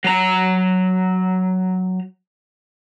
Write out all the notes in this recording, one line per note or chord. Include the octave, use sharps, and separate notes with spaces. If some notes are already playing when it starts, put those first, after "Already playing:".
F#3 A#5